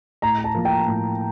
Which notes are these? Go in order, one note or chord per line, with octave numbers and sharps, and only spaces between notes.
A2 A#5
A5
F3 A#3
G5
A2